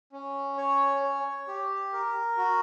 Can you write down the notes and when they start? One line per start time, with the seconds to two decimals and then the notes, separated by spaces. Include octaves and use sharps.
0.12 C#4
0.58 C#5
1.03 C#5
1.48 G4
1.93 A#4
2.37 F#4